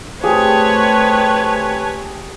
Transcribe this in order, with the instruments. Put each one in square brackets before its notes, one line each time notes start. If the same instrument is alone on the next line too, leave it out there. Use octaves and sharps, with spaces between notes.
[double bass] A3 C4 [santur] G4 G#4 [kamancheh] B4 C#5 [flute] A5